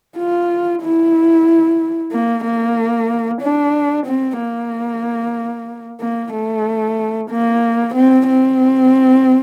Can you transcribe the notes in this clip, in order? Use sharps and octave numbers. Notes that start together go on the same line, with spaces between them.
F4
E4
A#3
A#3
D4
C4
A#3
A#3
A3
A#3
C4
C4